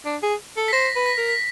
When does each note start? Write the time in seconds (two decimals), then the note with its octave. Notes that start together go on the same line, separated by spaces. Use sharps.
0.05 D4
0.23 G#4
0.57 A4
0.68 B6
0.73 C5 A#6
0.96 B4
1.06 B6
1.18 A#4
1.29 B6